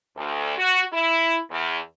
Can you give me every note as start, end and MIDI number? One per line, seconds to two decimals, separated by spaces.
0.16 0.57 38
0.58 0.82 66
0.93 1.39 64
1.51 1.78 40